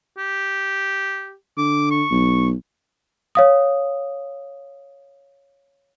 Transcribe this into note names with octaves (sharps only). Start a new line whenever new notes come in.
G4
D3 D6
C#6
B1
C#5 F5 D#6